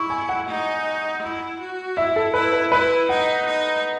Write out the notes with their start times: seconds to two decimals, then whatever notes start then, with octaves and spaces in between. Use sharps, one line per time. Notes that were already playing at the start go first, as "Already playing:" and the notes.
Already playing: E4 C#6
0.10 G#5
0.29 F#5
0.48 D#4
1.22 E4
1.60 F#4
1.97 E4 E5
2.16 A4
2.34 E4 B4
2.53 B4
2.72 E4 B4
3.09 D#4 F#5
3.46 D#4